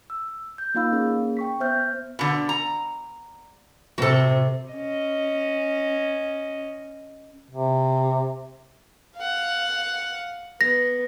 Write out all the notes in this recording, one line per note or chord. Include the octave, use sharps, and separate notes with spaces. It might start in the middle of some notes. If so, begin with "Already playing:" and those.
E6
G6
A#3 D#4 F4 F5 B5 E6
A#3 C#4 G#4
G5 C#6 B6
B3 C5 E5 F6 G6
B2 D3
A#5
C3 F#4 A4
C#4 D#5
C3
F5 F#5
B3 A#6